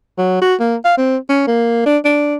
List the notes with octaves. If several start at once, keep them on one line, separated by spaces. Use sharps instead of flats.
F#3
F#4
A#3
F5
C4
C#4
A#3
D4
D4